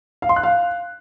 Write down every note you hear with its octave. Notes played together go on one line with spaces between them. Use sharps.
F5
C6
F#6
F5